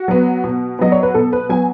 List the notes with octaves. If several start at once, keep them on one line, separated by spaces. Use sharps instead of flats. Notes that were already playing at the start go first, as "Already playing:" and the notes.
Already playing: F#4
F#3 B3
B2
F#3 B3 D#5
C#5
B4
B2 A4
B4
F#3 B3 G#5